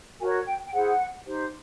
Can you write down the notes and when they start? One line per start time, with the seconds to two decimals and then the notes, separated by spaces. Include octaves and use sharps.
0.20 F#4 A#4 C#5 G#5
0.46 G5
0.65 G5
0.72 E4 G#4 C5 F#5
1.26 D#4 G4 C5